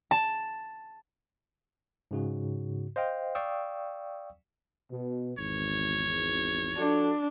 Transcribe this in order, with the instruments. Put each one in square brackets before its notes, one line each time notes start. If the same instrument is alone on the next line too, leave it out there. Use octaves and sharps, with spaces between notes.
[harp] A5
[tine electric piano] G#2 C#3 F#4
C5 D#5 F5 G5
D5 F5 G5 C#6 D#6 E6
[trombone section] B2
[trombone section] G#1 E2 [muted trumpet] C#5
[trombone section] F3 F#4 A4 [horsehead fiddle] D4